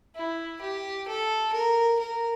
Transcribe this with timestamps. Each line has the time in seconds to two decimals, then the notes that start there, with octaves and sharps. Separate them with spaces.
0.16 E4
0.61 G4
1.08 A4
1.53 A#4
1.99 A#4